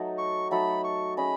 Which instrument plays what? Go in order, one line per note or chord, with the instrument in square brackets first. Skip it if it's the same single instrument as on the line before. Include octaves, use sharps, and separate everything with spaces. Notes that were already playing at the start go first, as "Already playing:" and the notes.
Already playing: [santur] F#3 A3 D#4 A4
[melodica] C#6
[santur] F#3 A3 D#4 A4 [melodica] B5
[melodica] C#6
[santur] C#4 G#4 D#5 [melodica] B5